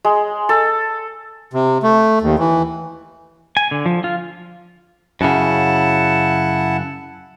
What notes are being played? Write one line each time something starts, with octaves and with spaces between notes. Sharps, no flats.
G#3
A4
C3
A3
D#2
E3
G#5
D3
F3
F4
F#2 C#3 E4 F#5 A5